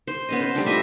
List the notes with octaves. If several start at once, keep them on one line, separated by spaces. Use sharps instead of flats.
C5
B3 C#4 D#5
C5
G3 A3 D4
F4 D#5 E5